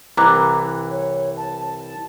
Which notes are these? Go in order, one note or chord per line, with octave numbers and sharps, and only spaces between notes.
C2 E3 A#5 D6 F#6
C#5
A5